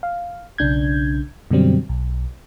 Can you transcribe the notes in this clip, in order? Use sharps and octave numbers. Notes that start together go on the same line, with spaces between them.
F5
B1 C#3 D4 G6 G#6
F#2 B2 D3 F#3 G3 C4
B1